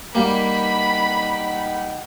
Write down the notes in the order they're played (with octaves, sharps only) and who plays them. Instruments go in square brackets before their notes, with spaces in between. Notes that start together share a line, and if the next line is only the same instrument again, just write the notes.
[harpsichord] G3 A#3 [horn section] D#4 F#5 G5 [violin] B5